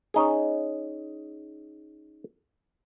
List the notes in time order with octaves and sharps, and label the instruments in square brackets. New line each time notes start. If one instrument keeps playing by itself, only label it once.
[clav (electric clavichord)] C#4 D#4 G#4